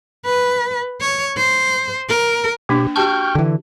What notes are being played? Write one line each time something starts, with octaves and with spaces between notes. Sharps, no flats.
B4
C#5
C5
A#4
B2 A#3 D4 G4
F#4 G4 G5 A5 C#6 F6 G6
D3 E3